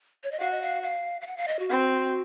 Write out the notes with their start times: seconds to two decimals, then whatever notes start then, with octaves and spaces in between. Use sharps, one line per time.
0.24 C#5
0.32 D#5
0.40 F#4 F5
0.51 D#5
0.62 F5
0.83 F5
1.21 F5
1.27 F#5
1.37 F5
1.48 D#5
1.59 F#4
1.70 C4